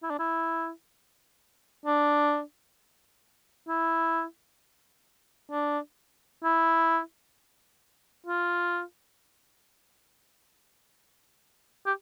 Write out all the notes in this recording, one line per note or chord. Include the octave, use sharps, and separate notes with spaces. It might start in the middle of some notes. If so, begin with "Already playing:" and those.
E4
D4
E4
D4
E4
D4
E4
F4
G4